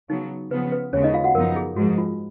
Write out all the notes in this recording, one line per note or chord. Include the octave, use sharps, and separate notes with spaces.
C#3 F#3 B3 D#4
C#3 F3 B3 B4
B4
D#2 C#3 G#3 B3 C#4 C#5
D#4 D#5
F4 F5
F#4 F#5
F#2 F3 B3 D#4 A#4
G#4
G#2 F3 G#3 F#4
F4